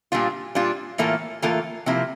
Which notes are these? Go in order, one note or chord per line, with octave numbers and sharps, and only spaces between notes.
A#2 G3 D4 F4
A#2 G3 D4 F4
A2 E3 A#3 F4 A4
A2 E3 A#3 F4 A4
C3 F3 A#3 E4